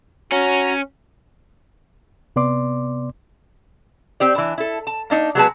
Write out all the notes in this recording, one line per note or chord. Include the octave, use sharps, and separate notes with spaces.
C#4 F#4 A#5
C3 B3 D5 C6 D6
C4 G4 D5
E3 D4
E4 A4
A5
A#3 D4 D#4
F#3 G#3 B3 G#4 B4 A5